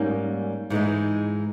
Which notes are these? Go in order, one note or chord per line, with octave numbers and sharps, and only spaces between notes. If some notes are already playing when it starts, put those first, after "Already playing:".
Already playing: G#2 G3 A#3 C#4
G#2 E3 G#3 D#4